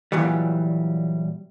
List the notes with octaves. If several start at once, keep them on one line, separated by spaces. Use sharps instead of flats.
A#2 E3 F#3 G3